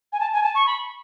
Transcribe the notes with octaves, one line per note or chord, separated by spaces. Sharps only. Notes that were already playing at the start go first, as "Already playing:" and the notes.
G#5
A5
G#5
A5
C#6
B5